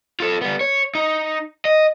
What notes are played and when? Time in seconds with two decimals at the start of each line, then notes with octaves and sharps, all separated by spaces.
0.20 F4 A4
0.41 G3 B3
0.61 C#5
0.95 D#4
1.65 D#5